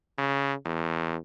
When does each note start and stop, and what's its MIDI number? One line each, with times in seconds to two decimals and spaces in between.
0.18 0.53 49
0.65 1.16 40